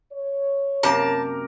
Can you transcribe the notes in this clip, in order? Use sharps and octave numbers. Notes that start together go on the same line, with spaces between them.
C#5
F#2 C3 A#3 G4 A#4 A5